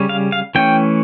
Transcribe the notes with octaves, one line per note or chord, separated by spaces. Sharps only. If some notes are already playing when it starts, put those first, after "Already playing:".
Already playing: C#3 G3 C#4
F5
F5
E3 A3 C#4 G5